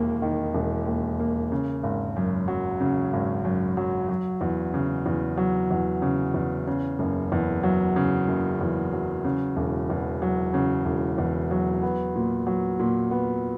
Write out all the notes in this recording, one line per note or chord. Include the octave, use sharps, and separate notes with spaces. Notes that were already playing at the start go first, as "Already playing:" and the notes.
Already playing: E1 D#2 A#3
D#3
E1
D#2
A#3
C#3
G#1
F#2
F#3
C#3
G#1
F#2
F#3
F#3
E2
C#3
E2
F#3
E2
C#3
E2
C#3
F#1
E2
F#3
C#3
F#1
E2
F#3
C#3
E1
E2
F#3
C#3
E1
E2
F#3
B3
A#2
F#3
A#2
B3